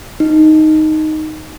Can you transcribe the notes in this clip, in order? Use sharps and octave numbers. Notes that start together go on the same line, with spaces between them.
D#4